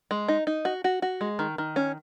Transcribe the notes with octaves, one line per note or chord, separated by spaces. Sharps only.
G#3
D#4
D#4
F#4
F#4
F#4
G#3
D#3
D#3
C#4